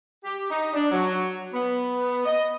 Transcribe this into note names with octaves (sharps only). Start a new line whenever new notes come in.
G4
D#4
D4
F#3
B3
D#5